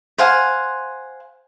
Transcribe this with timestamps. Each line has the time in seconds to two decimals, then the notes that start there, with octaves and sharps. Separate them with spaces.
0.18 C5 F5 F#5 G#5